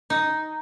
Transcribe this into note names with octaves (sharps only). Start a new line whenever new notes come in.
D#4